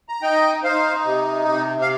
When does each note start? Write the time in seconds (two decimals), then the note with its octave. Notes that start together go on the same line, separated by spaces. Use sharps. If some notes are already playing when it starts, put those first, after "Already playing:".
0.09 A#5
0.22 D#4 D#5 G5
0.63 D#4 C5 F5
1.05 C3
1.47 C3
1.82 F5